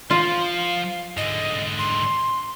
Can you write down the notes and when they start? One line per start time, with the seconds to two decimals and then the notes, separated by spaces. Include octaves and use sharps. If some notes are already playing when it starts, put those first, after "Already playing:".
0.10 F3 F4 F5
1.17 G#2 D3 D#5
1.79 C6